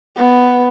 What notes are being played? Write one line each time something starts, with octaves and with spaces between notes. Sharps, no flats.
B3